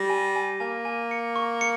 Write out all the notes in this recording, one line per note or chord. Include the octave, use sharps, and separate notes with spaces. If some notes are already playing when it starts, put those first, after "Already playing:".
Already playing: G3 A#6
G#5
G#5
A#3 G#5
G#5
C#7
C#6
C#7